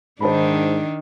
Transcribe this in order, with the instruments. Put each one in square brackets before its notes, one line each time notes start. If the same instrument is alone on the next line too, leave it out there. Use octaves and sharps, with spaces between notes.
[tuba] G#2 [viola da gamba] D#3 D4 [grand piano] C5 A5 B5